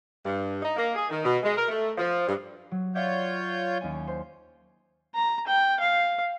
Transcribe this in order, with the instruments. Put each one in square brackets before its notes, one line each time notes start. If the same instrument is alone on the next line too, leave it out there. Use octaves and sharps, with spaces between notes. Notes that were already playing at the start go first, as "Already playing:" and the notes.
[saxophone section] G2
D#4
A#3
G#4
D#3
B2
G#3
A#4
A3
F3
G2
[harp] F#3
[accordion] F4 C#5 G6 [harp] D5 E5 F#5
[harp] D#2 C#4 G#5
C5
[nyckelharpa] A#5
G5
F5